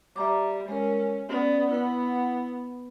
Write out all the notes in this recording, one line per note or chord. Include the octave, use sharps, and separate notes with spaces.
G3 E5 A#5 D6
G#3 C#4 A#4
B3 C#4 D5
B3 E4 F#5